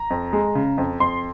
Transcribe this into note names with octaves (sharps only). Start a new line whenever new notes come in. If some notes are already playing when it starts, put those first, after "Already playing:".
Already playing: A#5
F2
G#3
C#3
F2
F2 C6